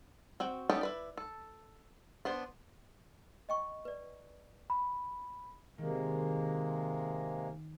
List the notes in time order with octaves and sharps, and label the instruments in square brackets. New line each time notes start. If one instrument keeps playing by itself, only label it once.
[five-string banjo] C4 F#4 G5
B3 C#4 D#4 G4 A4
E4 B4 D5
A4
B3 D4 C5
[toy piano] D#5 G5 C#6
B4 D5
[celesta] B5
[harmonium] C3 G#3 A#3 [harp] D#3